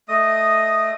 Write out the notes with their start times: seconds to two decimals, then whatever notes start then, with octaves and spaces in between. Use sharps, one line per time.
0.08 A3 D#5 D#6